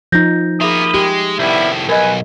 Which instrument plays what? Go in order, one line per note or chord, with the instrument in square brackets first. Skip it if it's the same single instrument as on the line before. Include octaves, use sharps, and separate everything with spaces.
[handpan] F3 D#4 [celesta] G6 A#6
[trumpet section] A#3 B5 D#6 [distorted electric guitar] G4 A#5 [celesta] G#4 E5
[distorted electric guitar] G#3 [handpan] G4
[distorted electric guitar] C2 A2 [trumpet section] G3 B3 E4
[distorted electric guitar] B1 [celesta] A#4 D#5 [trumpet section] B4 G#5